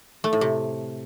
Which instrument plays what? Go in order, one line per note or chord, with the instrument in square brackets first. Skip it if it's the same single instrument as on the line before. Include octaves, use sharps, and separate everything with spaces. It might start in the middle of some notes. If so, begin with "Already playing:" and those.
[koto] A3
A2
C3